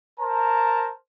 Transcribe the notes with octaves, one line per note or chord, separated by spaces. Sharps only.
A#4 C5 A5 A#5